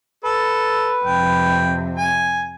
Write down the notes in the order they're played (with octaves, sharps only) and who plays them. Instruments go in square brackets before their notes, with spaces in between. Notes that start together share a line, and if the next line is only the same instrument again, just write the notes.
[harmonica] A4 [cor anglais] B4
[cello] F2 C3 [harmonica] G5
[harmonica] G#5